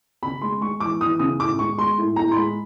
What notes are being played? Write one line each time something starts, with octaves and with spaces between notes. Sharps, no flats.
C#3 B5
G#3 C6
G#3 C#6
E3 D6
E3 D#6
C#3 D#6
A2 D6
G#3 C#6
G#3 C6
A2
A2 A#5
C6
G#3 B5